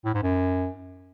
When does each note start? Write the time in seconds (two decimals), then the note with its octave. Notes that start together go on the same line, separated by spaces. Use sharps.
0.05 A2
0.14 G#2
0.23 F#2